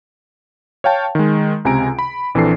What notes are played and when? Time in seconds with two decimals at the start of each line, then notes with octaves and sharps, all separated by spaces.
0.84 C#5 F5 G5 A5
1.15 D#3 G#3
1.65 C#2 C3 G#5 A#5 D7
1.99 B5
2.35 A#1 E3 C4 D4 A4 C7